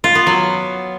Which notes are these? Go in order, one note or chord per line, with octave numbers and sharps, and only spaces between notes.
F4
B3
F#3